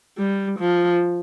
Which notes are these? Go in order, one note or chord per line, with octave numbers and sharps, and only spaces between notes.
G3
F3